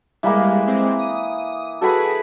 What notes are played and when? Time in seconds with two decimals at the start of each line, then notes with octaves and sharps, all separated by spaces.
0.23 E3 G3 G#3 A#3
0.66 G#3 C4
0.99 D#6
1.81 F#4 G#4 A4 B4 G5 B5